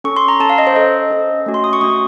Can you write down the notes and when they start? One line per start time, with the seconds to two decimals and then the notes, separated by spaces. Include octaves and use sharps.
0.04 C#4 A4 C#6
0.16 C6
0.28 A#5
0.40 C#4 A4 A5
0.50 F5
0.58 D#5
0.67 C5
0.75 C#4 A4 D#5
1.11 C#4 A4
1.46 A3 C#4 F#4
1.54 C6
1.64 D#6
1.73 C#6
1.81 A3 C#4 F#4 D#6